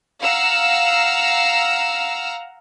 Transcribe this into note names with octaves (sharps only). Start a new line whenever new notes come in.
F5 F#5 A#5 E6